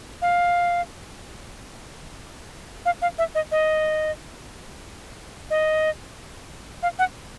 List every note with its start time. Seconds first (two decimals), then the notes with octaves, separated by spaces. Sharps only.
0.22 F5
2.86 F5
3.02 F5
3.18 E5
3.35 D#5
3.52 D#5
5.50 D#5
6.83 F5
6.99 F#5